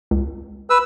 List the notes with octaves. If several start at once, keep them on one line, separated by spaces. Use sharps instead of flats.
C#2
B4 E6